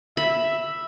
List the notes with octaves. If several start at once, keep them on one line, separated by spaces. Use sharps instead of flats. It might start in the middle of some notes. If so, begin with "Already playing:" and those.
E5 B5